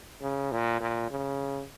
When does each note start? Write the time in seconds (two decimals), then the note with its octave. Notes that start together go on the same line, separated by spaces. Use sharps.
0.21 C#3
0.51 A#2
0.80 A#2
1.11 C#3